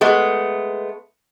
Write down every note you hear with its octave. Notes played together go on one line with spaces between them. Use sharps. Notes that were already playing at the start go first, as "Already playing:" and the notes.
G#3 A3 B3